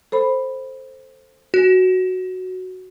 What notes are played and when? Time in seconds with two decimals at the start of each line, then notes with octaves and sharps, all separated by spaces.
0.12 A4 C5 B5
1.54 F#4 G#5 F#6